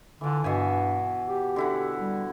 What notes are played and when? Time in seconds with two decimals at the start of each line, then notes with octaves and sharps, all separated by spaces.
0.21 D3 E3 F4
0.44 G2 B2 E5 G#5
1.28 G4
1.56 D3 E4 F#5
2.00 G3